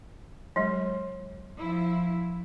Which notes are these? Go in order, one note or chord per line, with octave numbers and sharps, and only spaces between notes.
F#3 G#3
F3 E4